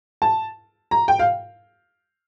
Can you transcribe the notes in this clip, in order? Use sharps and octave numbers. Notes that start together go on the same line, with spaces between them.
A5
A#5
G5
F5